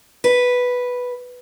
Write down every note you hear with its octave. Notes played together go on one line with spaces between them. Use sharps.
B4